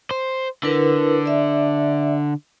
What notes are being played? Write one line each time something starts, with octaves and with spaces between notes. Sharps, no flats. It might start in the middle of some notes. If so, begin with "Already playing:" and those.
C5
D3 E4 A#4 B4
D5 E5